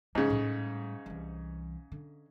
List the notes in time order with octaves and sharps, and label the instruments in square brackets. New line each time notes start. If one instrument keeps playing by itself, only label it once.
[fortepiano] G#2 C#3 [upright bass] G3
[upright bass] A2 G3
C2 E3
D3